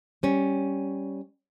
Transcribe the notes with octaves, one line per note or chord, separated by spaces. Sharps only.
G3 C#4